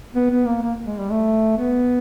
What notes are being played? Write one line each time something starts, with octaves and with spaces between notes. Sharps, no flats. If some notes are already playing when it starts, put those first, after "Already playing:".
B3
B3
A#3
A#3
G#3
G3
A3
B3